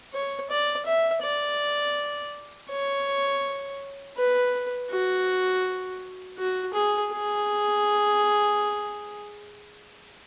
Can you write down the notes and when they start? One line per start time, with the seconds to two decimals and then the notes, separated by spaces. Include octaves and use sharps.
0.13 C#5
0.50 D5
0.86 E5
1.22 D5
2.70 C#5
4.17 B4
4.90 F#4
6.38 F#4
6.73 G#4
7.11 G#4